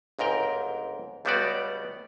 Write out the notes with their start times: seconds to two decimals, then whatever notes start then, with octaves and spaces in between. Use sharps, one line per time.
0.19 G1 C#2 G#2 A#4 G5
1.25 C#2 G3 A3 B3 F#4 D5